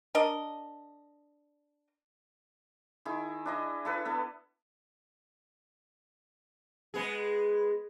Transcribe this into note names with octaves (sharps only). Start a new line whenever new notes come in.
D4 A#4 D#5
D#3 E4 G#4
D4 E4 D#5
E4 A4 B4
B3 A4
G#3 B3 G#4